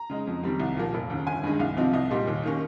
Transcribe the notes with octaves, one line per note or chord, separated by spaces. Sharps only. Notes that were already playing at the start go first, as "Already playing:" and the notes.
Already playing: A#5
C#3 G#3 D#4
F2
D#3 G3 C4
C2
A#2 F3 A#3
F1
D#2 C#3
G1 G#5
G2 D#3 G#3
C2 F5
C3 F3 C4 D#4
C2 D#5
A#2 G3 A#3 D#4
D#2
D#3 A#3 C#4